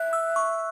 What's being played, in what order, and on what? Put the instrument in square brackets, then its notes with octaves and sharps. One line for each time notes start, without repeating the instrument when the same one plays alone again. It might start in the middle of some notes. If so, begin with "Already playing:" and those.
Already playing: [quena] E5 [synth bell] F#6
[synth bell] E6
C#6